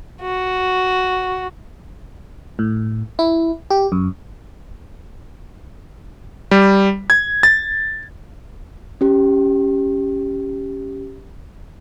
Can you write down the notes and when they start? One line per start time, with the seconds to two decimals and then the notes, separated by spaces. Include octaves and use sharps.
0.21 F#4
2.59 A2
3.19 E4
3.70 G4
3.92 F#2
6.51 G3
7.10 G#6
7.43 A6
9.01 C#4 G4